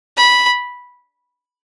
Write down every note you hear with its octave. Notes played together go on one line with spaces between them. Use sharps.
B5